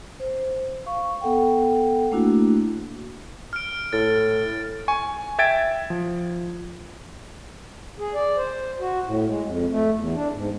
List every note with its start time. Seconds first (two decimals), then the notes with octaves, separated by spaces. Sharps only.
0.20 C5
0.86 F5 C#6
1.21 B3 A4 F#5 G5
2.12 A3 A#3 D4 E4 F#4
3.53 F6 D7
3.93 A2 F6 A6
4.88 G#5 C#6
5.39 E5 G5 G#6 A6 D7
5.90 F3
7.99 G#4
8.14 D5
8.37 C5
8.80 F#4
9.06 A2
9.27 G#3
9.43 F2
9.70 A3
9.95 E2
10.14 D4
10.32 G#2